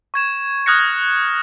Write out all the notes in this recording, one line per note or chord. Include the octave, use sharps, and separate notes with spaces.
C#6 G#6 E7
D#6 F6 F#6 G#6 A#6 C#7
G#6